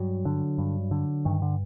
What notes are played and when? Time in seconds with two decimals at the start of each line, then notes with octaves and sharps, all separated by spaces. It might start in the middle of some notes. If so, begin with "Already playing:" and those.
Already playing: G2 F#3
0.25 D3
0.58 G2
0.91 D3
1.25 G2 D#3
1.42 D3